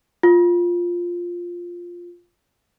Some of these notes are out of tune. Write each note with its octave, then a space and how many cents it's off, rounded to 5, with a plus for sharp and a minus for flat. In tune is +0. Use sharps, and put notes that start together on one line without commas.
F4 +5